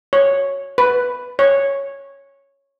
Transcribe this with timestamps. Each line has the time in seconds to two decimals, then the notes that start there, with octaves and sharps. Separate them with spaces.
0.13 C#5
0.78 B4
1.39 C#5